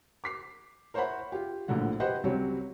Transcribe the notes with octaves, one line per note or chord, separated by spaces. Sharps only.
D6 B6 C7
A#4 C5 C#5 E5 F#5 B5
F4 G4
A#1 A2 D3 F#3 F#5
G4 B4 C5 D#5 F#5
C#2 F#3 G3 C4 C#5